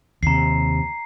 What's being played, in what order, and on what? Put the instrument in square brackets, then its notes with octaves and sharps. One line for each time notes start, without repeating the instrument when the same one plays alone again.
[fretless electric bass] D#2 C3 [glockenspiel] A#5 C7